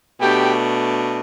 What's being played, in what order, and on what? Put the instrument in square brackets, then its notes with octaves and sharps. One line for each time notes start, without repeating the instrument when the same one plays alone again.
[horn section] B2 A3 D4 G4 G5